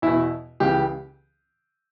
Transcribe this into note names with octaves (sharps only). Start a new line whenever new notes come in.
E2 B2 E4
C#2 C#3 E3 G4